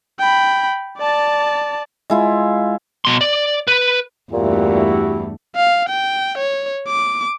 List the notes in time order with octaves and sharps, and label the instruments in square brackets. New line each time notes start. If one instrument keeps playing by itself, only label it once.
[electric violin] G5 B5
D5 A5
[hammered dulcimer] G#3 E4 F4
[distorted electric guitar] B2 C6
D5
B4
[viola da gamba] E2 G2 A3 [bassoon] A#2 [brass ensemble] E4 F#4 G4
[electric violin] F5
G5
C#5
D6